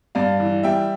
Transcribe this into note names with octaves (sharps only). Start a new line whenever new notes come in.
G2 D5 F5
E3
G3 E5 G5